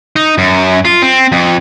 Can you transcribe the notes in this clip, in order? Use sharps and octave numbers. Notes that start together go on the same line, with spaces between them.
D#4
F#2
F4
C4
F2